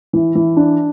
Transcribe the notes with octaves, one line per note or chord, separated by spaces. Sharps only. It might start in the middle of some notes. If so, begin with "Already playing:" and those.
E3
E3
D4